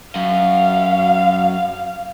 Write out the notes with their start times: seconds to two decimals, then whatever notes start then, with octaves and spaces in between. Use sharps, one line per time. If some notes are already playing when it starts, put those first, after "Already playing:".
0.16 F#2 F5